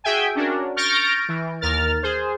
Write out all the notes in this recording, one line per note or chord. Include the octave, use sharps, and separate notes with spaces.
F#4 G#4 E5 G5 G#5
C#4 D4 F#4 A#4
C#6 F6 G6 A6 A#6 D7
E3
D#2 A#4 F6 A6
G#4 C5